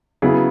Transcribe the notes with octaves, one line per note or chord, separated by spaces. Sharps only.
C#3 F#3 B3 E4 G#4